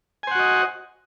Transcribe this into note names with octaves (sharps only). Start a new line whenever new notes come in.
F#4 C5 D#5 F#5 G#5